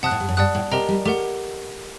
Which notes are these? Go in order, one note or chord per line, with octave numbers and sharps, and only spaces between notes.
C3 F#5 A5 D#6 F#6
A2
G2
F#2
G2 D5 F#5 A5 D#6 F#6
A2
C3 G4 A#4 D#5 G5 A#5
G3
A3 G4 A#4 F#5